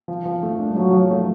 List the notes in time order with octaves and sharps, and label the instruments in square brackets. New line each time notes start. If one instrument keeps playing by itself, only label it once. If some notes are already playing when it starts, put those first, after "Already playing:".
[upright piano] F3
F3
A3
D4
[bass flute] G3
[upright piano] F3 [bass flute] F#3
[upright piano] F3
A3